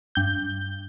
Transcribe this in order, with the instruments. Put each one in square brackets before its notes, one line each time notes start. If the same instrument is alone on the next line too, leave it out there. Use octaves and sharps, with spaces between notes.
[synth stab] G2 G6